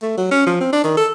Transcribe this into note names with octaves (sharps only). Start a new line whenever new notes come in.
A3
F#3
C#4
F3
C4
D4
D#3
A4